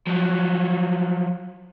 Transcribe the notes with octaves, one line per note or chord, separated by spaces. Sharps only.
F3 F#3